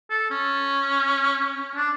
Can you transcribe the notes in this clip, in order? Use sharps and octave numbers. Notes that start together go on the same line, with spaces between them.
A4
C#4
D4